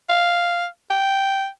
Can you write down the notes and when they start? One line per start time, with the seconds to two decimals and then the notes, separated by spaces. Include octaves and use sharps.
0.09 F5
0.90 G5